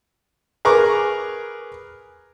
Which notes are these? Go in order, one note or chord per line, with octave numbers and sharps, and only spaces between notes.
G#4 A#4 B4 A#5 C#6 D6